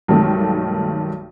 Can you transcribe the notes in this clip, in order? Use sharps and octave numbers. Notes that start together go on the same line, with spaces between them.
B1 G2 D#3 G#3 A3